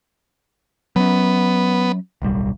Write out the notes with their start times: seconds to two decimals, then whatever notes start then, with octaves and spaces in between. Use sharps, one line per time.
0.96 F#3 B3 C#4
2.22 D1 B1 G3